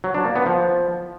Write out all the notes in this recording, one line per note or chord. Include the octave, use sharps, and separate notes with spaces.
F#3
D4
A#3
B3
F3